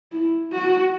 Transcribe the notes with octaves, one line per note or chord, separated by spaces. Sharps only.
E4
F#4